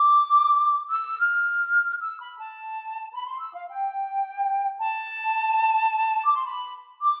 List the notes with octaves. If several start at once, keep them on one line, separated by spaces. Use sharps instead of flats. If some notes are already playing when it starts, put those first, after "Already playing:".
Already playing: D6
E6
F6
E6
B5
A5
B5
C6
E6
F5
G5
A5
D6
C6
B5
D6